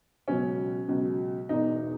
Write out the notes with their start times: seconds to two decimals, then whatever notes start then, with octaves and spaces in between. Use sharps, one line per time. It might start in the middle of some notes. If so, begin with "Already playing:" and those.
0.28 C#2 B2 F#3 C#4
0.88 C#2 B2 F#3
1.49 E1 E2 B2 D#4